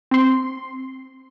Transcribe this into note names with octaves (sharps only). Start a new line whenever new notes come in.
C4 C6